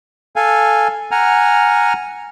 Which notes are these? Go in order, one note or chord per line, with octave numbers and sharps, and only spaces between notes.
A4 F5 G#5
F#5 G#5 A#5 F6